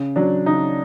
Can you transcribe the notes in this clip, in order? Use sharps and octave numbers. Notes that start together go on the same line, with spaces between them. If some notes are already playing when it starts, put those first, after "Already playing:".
Already playing: C#3
F#3 D4
C#3 D#4